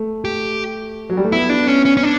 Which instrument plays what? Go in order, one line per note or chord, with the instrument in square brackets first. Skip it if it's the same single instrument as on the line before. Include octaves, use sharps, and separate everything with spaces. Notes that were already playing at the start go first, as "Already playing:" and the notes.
Already playing: [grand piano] A3
[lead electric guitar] G4
[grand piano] F#3
G3
A3
[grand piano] B3 [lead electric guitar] E4
[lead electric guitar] D4
C#4
C#4
C#4
D4